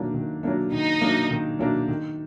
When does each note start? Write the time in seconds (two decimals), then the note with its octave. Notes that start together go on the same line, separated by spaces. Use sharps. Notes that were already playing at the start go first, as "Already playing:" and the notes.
Already playing: D#3 F#3 A#3 D4
0.14 D#3
0.43 F#3 A#3 D4
0.72 D#3 D#4
1.01 F#3 A#3 D4
1.30 D#3
1.59 F#3 A#3 D4
1.88 D#3